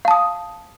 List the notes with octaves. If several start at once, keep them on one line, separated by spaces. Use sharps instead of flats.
F5 A5 D#6